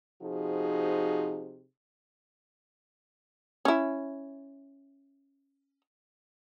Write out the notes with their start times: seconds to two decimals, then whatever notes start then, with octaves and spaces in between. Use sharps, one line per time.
0.22 C3 F3 D#4 F#4 G#4
3.65 C#4 E4